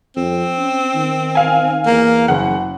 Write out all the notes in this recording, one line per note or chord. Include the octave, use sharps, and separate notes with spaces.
F2 C4
C#4
D#3
F5 G#5
E2 A#3
F#1 C#3 F#5